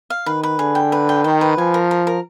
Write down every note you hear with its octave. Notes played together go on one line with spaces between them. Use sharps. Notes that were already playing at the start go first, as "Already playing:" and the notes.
F5
D#3 B4
B4
D3 G#4
G5
B4
G5
D#3 G5
B4
F3 G#5
A#4
A#4
A#4